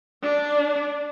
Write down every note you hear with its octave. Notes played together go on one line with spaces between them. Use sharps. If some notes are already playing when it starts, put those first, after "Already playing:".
D4